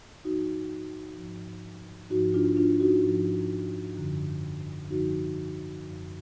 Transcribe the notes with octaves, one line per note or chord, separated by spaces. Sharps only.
G#2 F3 D#4 F#4
G#2 F3
G#2 F3 D#4 F#4
D4 F4
D4 F4
D#4 F#4
G#2 F3
F#2 D3 F3
F#2 D3 F3 D#4 F#4
F#2 D3 F3